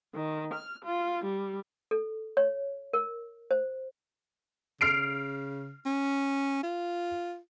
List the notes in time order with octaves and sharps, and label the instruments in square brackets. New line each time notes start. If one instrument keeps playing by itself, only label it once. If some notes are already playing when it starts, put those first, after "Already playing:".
[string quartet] D#3
F6
F4
G3
[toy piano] A4
C#5
A#4
C5
[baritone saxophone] C#3 [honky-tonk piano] F6 C7 D7
[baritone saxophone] C#4
F4